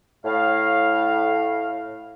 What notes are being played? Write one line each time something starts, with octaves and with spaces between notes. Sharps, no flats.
A2 F5